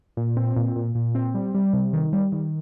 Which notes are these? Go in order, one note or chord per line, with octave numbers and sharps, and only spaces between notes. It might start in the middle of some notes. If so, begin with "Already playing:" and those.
A#2
C4
A#2
A#2
A#2
C4
G3
G3
C3
D#3
G3
D#3